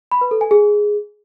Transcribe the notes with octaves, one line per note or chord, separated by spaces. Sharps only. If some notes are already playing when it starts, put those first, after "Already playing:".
B5
B4
A4
G#5
G#4